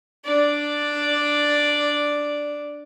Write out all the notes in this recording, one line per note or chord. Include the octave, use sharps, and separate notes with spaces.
D4 D5